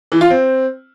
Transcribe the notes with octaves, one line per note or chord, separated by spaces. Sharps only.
E3
F4
C4